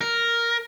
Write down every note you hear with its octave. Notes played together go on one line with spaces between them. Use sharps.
A#4